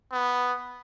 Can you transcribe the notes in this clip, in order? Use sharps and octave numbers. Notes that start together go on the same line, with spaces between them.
B3